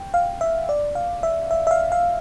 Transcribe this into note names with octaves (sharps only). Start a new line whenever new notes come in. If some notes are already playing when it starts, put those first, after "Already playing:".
Already playing: G5
F5
E5
D5
F5
E5
E5
E5
F5
F5